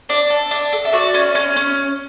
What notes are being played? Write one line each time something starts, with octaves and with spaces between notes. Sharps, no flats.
D4 D5
A4
D4
A4
E5
F#4 D5
C#4
C#4
C#4